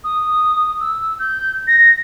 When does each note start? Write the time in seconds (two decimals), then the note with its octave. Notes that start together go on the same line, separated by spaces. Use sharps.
0.04 D#6
0.80 E6
1.19 G6
1.67 A#6